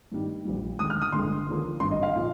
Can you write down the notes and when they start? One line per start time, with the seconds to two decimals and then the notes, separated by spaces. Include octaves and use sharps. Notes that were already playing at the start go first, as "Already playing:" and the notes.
0.12 G2 D#3 G3
0.45 A#1 A#2 G3
0.79 D#2 D3 G#3 D#6
0.90 F6
1.02 D#6
1.12 G1 G2 D3 G#3 C6
1.46 D#2 D3 F3 A#3
1.80 G#1 G2 D3 C6
1.91 D#5
2.03 F5
2.16 A#2 F3